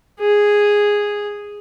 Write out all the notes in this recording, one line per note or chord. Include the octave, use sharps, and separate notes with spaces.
G#4